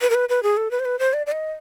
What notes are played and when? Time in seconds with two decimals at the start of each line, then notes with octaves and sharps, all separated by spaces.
0.01 B4
0.10 A#4
0.15 B4
0.29 B4
0.43 G#4
0.57 A4
0.71 B4
0.80 C5
0.85 B4
0.99 C5
1.13 D5
1.26 D5
1.32 D#5